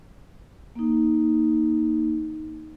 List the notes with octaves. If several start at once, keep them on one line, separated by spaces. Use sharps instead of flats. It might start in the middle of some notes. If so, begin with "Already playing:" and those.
A#3 D#4